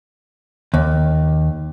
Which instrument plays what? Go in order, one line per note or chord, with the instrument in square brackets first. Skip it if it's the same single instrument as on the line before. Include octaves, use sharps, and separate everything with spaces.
[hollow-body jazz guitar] D#2